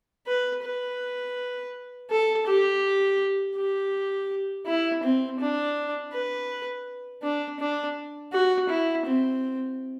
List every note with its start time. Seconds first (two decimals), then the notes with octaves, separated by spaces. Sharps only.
0.27 B4
0.64 B4
2.10 A4
2.46 G4
3.56 G4
4.67 E4
5.03 C4
5.40 D4
6.13 B4
7.23 D4
7.60 D4
8.32 F#4
8.69 E4
9.06 C4